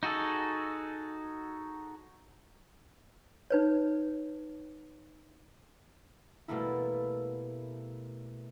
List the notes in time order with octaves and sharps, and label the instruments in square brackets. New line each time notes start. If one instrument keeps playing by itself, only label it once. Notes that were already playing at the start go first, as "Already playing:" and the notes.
[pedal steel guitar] D#4 F#4 G#4 A4
[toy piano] D#4 B4 C#5
[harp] B2 G3 A3 A#3 E4